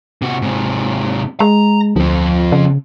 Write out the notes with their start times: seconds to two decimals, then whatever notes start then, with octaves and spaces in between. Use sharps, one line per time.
0.22 C3 F#4
0.42 G#2 C3
1.40 G#3 A#5
1.96 D2 F3 C4
2.52 C#3